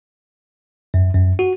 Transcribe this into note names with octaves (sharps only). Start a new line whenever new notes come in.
F#2
F#2
F#4